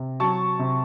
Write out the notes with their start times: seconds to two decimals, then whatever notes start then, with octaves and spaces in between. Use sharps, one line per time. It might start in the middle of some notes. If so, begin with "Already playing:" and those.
Already playing: C3
0.20 F#3 A5 C#6
0.59 C3